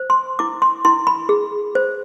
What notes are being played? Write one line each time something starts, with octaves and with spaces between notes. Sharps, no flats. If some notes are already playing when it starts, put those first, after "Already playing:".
Already playing: C5
C6
E4 D6
C6
E4 C6
B5
G#4
C5